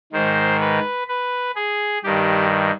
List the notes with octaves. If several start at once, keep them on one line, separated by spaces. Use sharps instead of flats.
G#2 D#3 C5
B4
B4
G#4
G2 D#3 G4